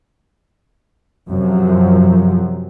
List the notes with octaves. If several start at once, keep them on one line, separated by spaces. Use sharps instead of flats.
F#2 C3 F3 F#3